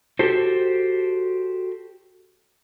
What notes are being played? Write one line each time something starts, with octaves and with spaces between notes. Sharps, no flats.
F#4 G4 A4 C5